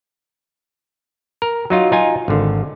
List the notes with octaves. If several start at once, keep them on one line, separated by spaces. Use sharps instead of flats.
A#4
F#3 D#4 F4
D#4 F4 G#5
G#1 D3